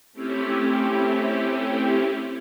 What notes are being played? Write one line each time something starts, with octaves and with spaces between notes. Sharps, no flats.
A3 C4 C#4 E4 G4